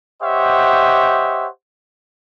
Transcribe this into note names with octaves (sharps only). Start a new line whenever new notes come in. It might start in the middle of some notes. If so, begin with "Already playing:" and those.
G4 C5 C#5 D#5 E5 F#5